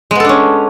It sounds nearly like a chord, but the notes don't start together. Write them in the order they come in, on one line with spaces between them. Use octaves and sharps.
G#3 B3 A4 D4 C#4